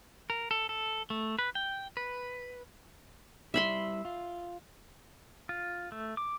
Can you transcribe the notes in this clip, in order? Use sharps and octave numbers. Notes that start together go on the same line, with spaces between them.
A#4
A4
A4
A3
B4
G5
B4
G3 E4 E5 B5 C6
F4
F4
A3
D6